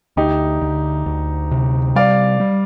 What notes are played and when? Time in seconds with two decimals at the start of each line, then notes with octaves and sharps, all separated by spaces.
0.17 D2 D#4 G4
0.62 D2
1.06 D2
1.51 C3
1.96 G3 D5 F5
2.40 G3